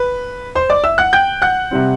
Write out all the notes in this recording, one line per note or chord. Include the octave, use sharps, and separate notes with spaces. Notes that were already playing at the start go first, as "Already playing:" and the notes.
Already playing: B4
C5 C6
D5 D6
E5 E6
F#5 F#6
G5 G6
F#5 F#6
C3 G3 C4